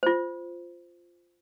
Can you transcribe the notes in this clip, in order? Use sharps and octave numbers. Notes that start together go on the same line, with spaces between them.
F4 C5